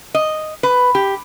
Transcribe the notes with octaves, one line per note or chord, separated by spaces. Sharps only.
D#5
B4
G4